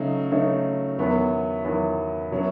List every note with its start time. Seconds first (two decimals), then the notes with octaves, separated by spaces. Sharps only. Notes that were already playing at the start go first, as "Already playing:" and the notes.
Already playing: C#3 F#3 A3 D#4
0.32 C#3 F#3 A3 D#4
0.98 E2 D#3 F#3 B3 E4
1.65 E2 D#3 F#3 B3 E4
2.32 B2 F#3 C#4 E4